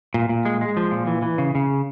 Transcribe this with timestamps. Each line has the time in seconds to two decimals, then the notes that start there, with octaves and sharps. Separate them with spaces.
0.14 A#2
0.29 A#2
0.45 G#3
0.61 G#3
0.77 F3
0.91 A#2
1.07 E3
1.22 E3
1.38 C#3
1.55 C#3